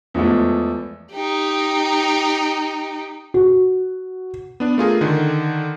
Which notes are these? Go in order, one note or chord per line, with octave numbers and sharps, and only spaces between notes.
E2 F3 G#3 A3
D#4 G4
F#4
B3 D4
A3 F4 G#4 A#4
D3 D#3